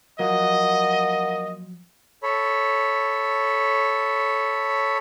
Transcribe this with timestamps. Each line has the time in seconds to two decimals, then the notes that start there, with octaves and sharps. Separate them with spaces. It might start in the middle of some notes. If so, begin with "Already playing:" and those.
0.19 F3 F#3 A#3 D#5 F#5
2.23 A4 C#5 B5